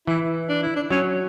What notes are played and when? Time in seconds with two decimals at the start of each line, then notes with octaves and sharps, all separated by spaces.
0.07 E3 E4
0.49 D4
0.63 E4
0.76 D4
0.90 F#3 C#4